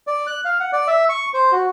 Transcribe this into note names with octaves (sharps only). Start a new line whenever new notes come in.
D5
F#6
F5
F#5
D5
E5
C#6
C5
F#4